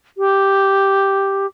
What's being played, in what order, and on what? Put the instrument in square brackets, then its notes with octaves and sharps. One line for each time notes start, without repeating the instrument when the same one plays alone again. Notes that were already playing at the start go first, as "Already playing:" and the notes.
[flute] G4